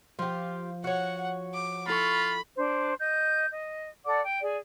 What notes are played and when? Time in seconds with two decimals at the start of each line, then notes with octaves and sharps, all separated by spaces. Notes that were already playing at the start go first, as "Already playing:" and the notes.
0.19 F3 F4 G4
0.84 F#4 C#5 F#5
1.54 D6
1.87 E4 F4 A4 B5 C#6
2.56 D4 C5
2.99 D#5 G6
3.50 D#5
4.05 A4 D5 F#5 D6
4.23 G5
4.41 G#4 D5